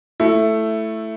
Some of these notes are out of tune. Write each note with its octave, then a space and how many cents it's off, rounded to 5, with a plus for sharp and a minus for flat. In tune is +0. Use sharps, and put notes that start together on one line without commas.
A3 +0 E4 +10